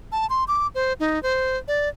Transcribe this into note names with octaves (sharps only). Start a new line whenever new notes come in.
A5
C6
D6
C5
D#4
C5
D5